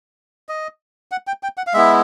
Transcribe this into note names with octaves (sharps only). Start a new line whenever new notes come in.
D#5
F#5
G5
G5
F#5
F5
G#3 B3 E4 E5